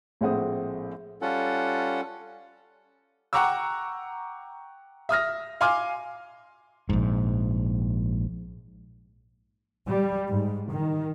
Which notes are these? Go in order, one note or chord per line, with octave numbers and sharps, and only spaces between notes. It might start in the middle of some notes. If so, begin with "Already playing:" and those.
A#1 A2 G#3 C4 F#5 D#6
G3 C#4 F4 A4 F#5
F#5 G5 A#5 C#6 D6 E6
E5 D#6 F6 A#6
F5 G#5 C6 D6 F6
A#1 G#2
G3
G#2
D#3